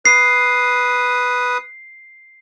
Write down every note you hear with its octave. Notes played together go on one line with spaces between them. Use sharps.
B4 D#6 C7